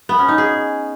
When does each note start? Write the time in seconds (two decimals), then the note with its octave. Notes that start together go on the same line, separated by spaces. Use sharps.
0.09 B3
0.19 C#4
0.28 D#4
0.38 G#4